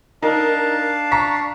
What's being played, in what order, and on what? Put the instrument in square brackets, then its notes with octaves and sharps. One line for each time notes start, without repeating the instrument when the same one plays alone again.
[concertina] D4 F5 A5 [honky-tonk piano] D#4 A#4
[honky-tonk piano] A#5 C#6 B6